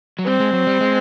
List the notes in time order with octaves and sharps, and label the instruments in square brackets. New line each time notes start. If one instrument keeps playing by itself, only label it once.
[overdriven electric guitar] F#3
[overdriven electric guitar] G3 [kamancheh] C4
[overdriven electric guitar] G#3
F#3
G3
G#3